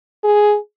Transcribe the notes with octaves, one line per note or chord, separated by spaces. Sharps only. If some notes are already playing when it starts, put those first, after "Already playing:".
G#4